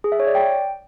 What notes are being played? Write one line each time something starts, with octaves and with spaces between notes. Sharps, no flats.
G#4
E5
C#5
D5
G5